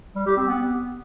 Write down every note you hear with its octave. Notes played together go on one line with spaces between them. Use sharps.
G3
G4
C4
B3